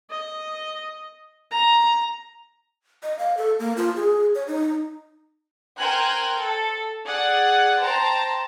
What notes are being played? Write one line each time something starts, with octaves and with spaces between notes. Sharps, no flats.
D#5
A#5
D#5
F5
A4
A#3
F4
G#4
C#5
D#4
A#4 C5 G5 G#5 F#6
A4
G#4 D5 F#5
C5 G5 A5 A#5